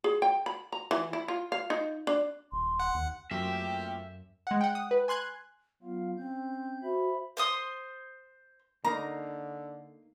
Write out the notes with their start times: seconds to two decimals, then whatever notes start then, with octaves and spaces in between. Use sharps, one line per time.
0.04 G#4
0.22 G5
0.46 B5
0.72 A#5
0.91 E3
1.13 E4
1.28 F4
1.52 F5
1.70 D#4
2.07 D4
2.52 D#1 C6
2.80 F#5
2.95 D#2
3.31 F#2 A3 A#3 C4 C#4 F4 G4 E5
4.47 G#3 F#5
4.61 F#5 G5
4.75 D#6
4.91 B4
5.08 G#5 C6 F#6 G#6
5.83 F#3 B3 F4 F5
6.18 C4 C#4 G6
6.83 F#4 C5 E5 B5
7.37 C5 C6 D#6
8.85 D3 A#3 D#4 A#5